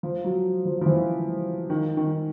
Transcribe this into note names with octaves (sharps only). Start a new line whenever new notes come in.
F3
F#3
F3
F3
E3
D#3
D#3